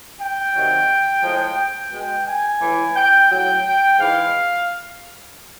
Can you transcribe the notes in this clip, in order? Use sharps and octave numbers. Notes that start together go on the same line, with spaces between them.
G5
C3 D#3 F#3
A2 F3 G#3
G5
B2 G#3
G#5
A2 E3 G#3
G5
A2 F#3 G5
G#2 E3 G#3 F5